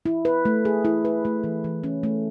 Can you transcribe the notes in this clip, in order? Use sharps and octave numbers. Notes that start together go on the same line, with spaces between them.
E4
B4
A3
G#4
E4
B4
A3
E3
E3
C#4
A3